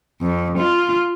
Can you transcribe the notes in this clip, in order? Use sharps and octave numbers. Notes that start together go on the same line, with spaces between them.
F2
F4